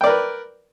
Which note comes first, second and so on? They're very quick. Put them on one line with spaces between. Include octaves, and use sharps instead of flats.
G5 D5 A#4 B4